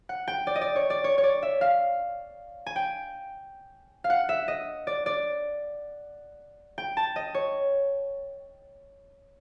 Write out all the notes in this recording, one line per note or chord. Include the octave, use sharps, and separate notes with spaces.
F#5
G5
D5
D#5
D5
C#5
D5
C#5
C#5
D5
E5
F5
G#5
G5
F5
F#5
E5
D#5
D5
D5
G5
A5
D#5
C#5